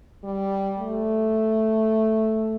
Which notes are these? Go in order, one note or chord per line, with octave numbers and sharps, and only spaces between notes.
G3
A3